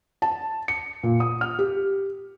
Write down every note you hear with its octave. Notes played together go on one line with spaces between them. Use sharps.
A5
C#7
A#2
D#6
F6
G4